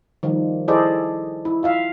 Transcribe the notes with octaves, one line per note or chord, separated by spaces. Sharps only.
D#3 F3 G3
E4 G#4 A4 C5 D5 D#5
E4
F4 E5 F5